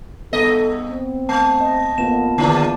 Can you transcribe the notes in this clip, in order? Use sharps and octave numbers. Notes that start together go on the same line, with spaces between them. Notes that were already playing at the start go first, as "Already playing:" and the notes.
G2 B3 A4 D#5
C4
A3 A5
D#5
F2 A#3 B3 F4 E7
E2 D3 E3 F3 F4 D5